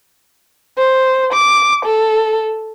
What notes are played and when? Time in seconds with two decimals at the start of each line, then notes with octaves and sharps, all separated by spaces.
0.78 C5
1.33 D6
1.85 A4